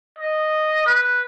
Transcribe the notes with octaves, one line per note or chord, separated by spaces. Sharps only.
D#5
B4